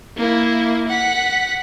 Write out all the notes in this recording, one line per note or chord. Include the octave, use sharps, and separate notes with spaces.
A#3 E4
F#5 B6